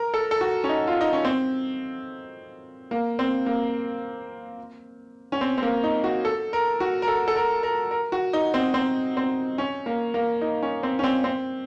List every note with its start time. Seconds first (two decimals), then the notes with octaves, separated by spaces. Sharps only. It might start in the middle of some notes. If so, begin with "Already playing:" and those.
Already playing: A#4
0.14 A4
0.31 A4
0.41 F#4
0.64 C#4
0.69 D#4
0.87 F4
1.01 D#4
1.13 C#4
1.25 C4
2.91 A#3
3.19 C4
3.46 A#3
5.32 C#4
5.41 C4
5.58 C4
5.62 A#3
5.84 D#4
6.04 F#4
6.25 A4
6.53 A#4
6.80 F#4
7.02 A#4
7.08 A4
7.28 A4
7.36 A#4
7.63 A#4
7.91 A#4
8.12 F#4
8.33 D#4
8.54 C4
8.74 C4
9.17 C4
9.58 C#4
9.86 A#3
10.14 A#3
10.41 D#4
10.62 C#4
10.83 C4
10.99 C#4
11.04 C4
11.24 C4